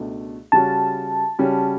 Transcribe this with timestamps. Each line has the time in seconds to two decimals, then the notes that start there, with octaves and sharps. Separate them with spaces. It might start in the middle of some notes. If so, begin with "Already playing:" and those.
Already playing: C#2 B2 A3 D4
0.52 C#3 G3 C#4 F#4 A5
1.39 C#3 G3 C#4 F#4